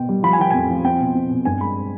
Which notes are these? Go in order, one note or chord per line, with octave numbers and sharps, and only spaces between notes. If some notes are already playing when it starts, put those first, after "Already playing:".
Already playing: B2 G5
G3
F3 B5
G#5
F3 G5
F2 G#5
F3
C4 G5
B2
C4
B2
G2 G#5
G#3 B5